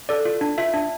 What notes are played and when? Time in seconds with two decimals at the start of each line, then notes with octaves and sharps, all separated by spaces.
0.09 A4 D5
0.25 F4
0.41 D4
0.58 F4 E5
0.74 D4